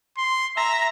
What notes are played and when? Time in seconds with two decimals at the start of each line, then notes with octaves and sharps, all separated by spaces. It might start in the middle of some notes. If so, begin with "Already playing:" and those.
0.18 C6
0.57 E5 A#5